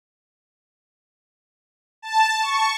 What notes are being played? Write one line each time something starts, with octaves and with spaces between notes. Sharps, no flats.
A5
C#6